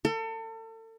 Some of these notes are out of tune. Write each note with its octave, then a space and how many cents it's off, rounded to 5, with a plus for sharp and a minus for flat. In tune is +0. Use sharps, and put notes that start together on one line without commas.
A4 +35